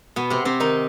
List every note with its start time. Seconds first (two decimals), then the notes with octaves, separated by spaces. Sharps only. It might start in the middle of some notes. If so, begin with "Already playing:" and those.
0.16 B2 B3
0.30 C3 C4
0.45 C3 C4
0.60 D#3 D#4